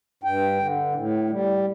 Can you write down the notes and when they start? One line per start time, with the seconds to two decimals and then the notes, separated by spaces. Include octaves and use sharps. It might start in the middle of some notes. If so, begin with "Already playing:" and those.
0.23 G2 G5
0.59 D3
0.95 A2
1.30 G3